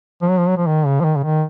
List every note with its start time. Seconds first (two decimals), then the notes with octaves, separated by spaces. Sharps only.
0.22 F3
0.30 F#3
0.38 F3
0.48 F#3
0.57 F3
0.67 D#3
0.86 C#3
1.00 F3
1.05 D#3
1.16 C#3
1.24 D#3